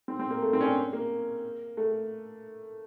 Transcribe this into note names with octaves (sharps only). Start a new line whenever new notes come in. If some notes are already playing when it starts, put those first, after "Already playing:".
C4
C4
A#3
A3
C4
C#4
D4
A#3
A3